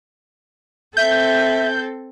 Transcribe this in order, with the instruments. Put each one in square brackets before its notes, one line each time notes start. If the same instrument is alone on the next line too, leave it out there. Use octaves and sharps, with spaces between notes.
[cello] C4 A4 [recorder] E5 [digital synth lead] G6